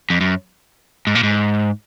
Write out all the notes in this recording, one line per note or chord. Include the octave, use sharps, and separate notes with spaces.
F2
F#2
G#2
A#2
G#2